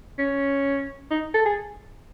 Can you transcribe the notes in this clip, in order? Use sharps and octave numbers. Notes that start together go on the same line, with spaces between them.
C#4
D#4
A4
G#4